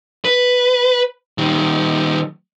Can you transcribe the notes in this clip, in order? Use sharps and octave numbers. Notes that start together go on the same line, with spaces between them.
B4
D#3 G3